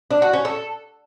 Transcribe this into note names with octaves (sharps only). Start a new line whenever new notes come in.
D4
F#4
C#4
A4